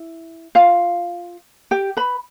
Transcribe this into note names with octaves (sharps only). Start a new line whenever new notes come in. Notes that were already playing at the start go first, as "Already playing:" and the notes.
Already playing: E4
F4 F5
G4 G5
B4 B5